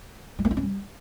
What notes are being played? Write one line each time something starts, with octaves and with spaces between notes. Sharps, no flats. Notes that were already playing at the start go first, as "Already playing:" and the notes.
G#3
A#3
D4
C#4
G3